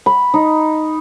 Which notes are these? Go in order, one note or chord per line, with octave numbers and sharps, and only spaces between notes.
B5
D#4